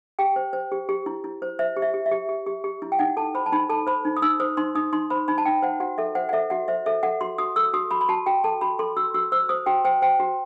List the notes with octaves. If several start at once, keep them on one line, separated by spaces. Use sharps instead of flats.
G4 G5
C5
C5
G4
G4
E4
E4
C5
C5 E5
G4
E5
G4
E5
G4
G4
G4
G4
E4
G5
D#4 F#5
A4 A5
C5 B5
A5
D#4 B5
A4 A5
C5 B5
D#4
D#6
D#4 E6
C5 D#6
D#4 C6
D#4 D#6
D#4 C6
C5 B5
D#4 B5
A5
D#4 G5
C5 F#5
F#4 F#5
A4 E5
C5 F#5
F#5
A4 E5
F#4 F#5
C5 E5
A4 E5
A4 F#5
F#4 C6
F#4 D#6
A4 E6
F#4 D#6
F#4 B5
B5
F#4 A5
F#4 G5
A4 A5
F#4 B5
A4 C6
F#4 E6
F#4 E6
C5 E6
C5 D#6
F#4 G5
C5 G5
C5 G5
F#4